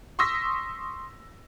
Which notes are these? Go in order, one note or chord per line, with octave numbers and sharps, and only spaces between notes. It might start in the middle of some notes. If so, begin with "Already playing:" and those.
C6 C#6 D#6 E6 A#6 B6